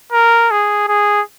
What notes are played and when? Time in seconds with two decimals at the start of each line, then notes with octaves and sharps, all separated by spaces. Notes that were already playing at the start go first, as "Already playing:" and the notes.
0.12 A#4
0.51 G#4
0.88 G#4